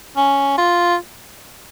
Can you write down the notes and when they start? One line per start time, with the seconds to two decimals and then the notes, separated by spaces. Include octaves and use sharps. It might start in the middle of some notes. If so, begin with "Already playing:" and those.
0.16 C#4
0.58 F4